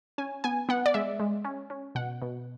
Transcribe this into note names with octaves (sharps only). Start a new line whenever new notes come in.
C#4 G#5
B3 G#5
B3 F#5
D5
G#3 E5
G#3
C#4
C#4
B2 F#5
B2